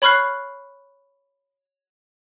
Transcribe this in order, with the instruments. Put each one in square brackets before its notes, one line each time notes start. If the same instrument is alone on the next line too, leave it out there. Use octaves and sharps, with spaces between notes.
[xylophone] C#5 B5 C#6 F6 F#6 C7